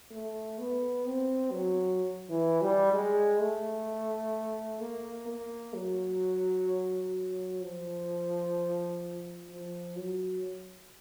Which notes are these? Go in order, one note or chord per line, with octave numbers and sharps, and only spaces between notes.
A3
B3
C4
F#3
E3
G3
G#3
A3
A#3
A#3
F#3
F3
F3
F#3